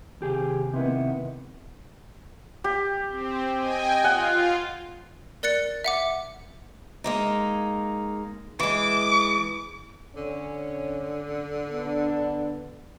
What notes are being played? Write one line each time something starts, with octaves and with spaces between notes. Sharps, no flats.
D#2 C3 G4 G#4
C3 D#3 B3 E4
G4
C4
D#5 G5 G#5
F4 F#5 G#5
A#4 D5 F#6 A6 C#7
E5 F#5 D6
G#3 A#3 D#4
E3 G#3 D6
D3 C#4
B3 D4